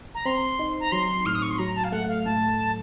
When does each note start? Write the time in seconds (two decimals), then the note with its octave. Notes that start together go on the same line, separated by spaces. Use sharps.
0.15 A#5
0.25 C4 C6
0.59 D#4
0.80 A#5
0.92 F#3 C6
1.26 A2 F6
1.35 D#6
1.42 C#6
1.51 C6
1.59 F#3 A#5
1.76 A5
1.84 F5
1.92 A3 F#5
2.08 F5
2.25 A2 A5